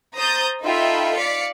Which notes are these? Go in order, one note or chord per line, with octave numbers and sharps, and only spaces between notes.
C5 A#5 D#6 G6 A6
D#4 F4 A4 E5 G5 B5
D5 F5 B6 C#7